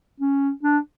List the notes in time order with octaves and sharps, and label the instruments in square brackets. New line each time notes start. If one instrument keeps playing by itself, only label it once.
[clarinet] C#4
D4